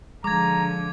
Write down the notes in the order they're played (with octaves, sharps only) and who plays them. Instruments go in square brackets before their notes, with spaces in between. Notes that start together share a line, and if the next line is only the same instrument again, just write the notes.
[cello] D3 F3 [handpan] G#3 [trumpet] A#5 [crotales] D6 G#6